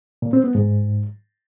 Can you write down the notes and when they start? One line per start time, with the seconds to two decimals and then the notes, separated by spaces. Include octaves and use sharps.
0.22 A#2
0.33 C4
0.44 B3
0.55 G#2